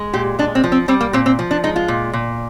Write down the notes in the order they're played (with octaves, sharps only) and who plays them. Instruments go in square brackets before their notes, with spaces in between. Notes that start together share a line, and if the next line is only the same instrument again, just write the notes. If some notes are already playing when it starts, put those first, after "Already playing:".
Already playing: [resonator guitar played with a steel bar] G#3
A#2 G4
G#3 D4
C4
F3
C4
G3 C4
A#3
A#2 C4
C4
F3
D4
G#3 D#4
F4
A#2
A#2